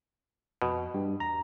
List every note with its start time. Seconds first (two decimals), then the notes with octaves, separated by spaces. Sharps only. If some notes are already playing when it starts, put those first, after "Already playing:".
0.62 F2 B2
0.94 G2 G4
1.20 E2 A#5